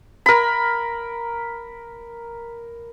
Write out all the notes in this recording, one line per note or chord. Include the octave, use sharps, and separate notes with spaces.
A#4 B5